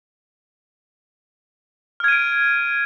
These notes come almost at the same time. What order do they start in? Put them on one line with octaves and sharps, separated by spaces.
F6 G#6 D#7 D7